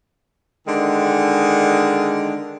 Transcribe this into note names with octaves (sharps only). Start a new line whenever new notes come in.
D3 D#3 G#3